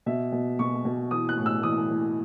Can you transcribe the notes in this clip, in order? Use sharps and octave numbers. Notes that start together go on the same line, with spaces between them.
B2 E5
B2
B2 C#6
B2
E3 D#6
F#6
A2
E6
E3 D#6
E3